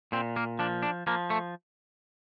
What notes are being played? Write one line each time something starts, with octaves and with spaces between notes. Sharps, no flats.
A#2 C4
A#3
F3 D4
D4
F3 A#3
A3